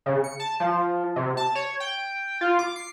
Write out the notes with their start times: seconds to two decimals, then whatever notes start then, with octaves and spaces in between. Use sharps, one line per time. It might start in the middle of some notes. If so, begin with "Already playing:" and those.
0.06 C#3
0.24 C#7
0.40 A5
0.60 F3
1.16 C3
1.37 A5
1.55 C#5
1.80 G5
2.41 F4
2.59 D6
2.76 C7